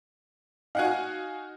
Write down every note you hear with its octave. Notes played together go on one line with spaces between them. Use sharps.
D#4 F#4 F5 F#5 G#5